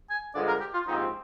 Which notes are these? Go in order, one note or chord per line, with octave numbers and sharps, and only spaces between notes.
G#5
G2 D3 F3 G#3 D5
A#4
G4
F4
A#1 G#2 F3 C4 D#4 G4